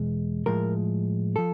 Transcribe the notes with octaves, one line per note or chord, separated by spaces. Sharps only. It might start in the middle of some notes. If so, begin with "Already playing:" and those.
Already playing: E2 B2 G#3
A2 F3 G#3 A#4
F3 A4